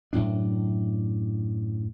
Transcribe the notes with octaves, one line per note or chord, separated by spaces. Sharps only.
F#2 A2 D4